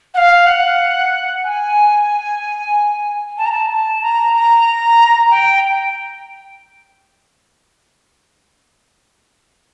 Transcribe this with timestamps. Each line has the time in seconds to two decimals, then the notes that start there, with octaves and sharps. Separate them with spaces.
0.14 F#5
0.17 F5
0.46 F#5
1.44 G#5
3.37 A5
3.45 A#5
3.52 A5
3.69 A5
4.02 A#5
4.34 A#5
5.30 G5